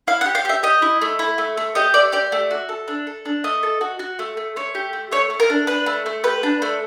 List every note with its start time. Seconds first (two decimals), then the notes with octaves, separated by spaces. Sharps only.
0.07 E4 F5
0.21 F#5
0.26 G4
0.35 F5
0.45 G4 E5
0.63 G4 D#5
0.82 E4
1.01 A3
1.19 E4
1.38 A3
1.57 A3
1.75 G4 D#5
1.94 A3 D5
2.12 G4 D5
2.32 A3
2.51 F#4
2.69 A4
2.88 D4
3.07 A4
3.25 D4
3.44 A3 D#5
3.63 A4
3.81 F#4
3.99 F#4
4.19 A3
4.37 A3
4.56 A3 C#5
4.75 G4
4.93 A3
5.12 A3 C#5
5.30 A3
5.40 A#4
5.50 D4
5.67 D4 B4
5.86 A3
6.06 A3
6.24 G4 B4
6.43 D4
6.62 A3